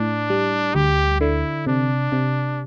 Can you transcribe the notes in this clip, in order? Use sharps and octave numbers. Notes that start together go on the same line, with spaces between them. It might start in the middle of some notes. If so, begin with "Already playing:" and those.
Already playing: A2 D4
G3
D2 G4
D3 E4
C3 D4
C3